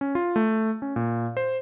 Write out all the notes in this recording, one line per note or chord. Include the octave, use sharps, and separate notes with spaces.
C#4
F4
A3
C#4
A#2
C5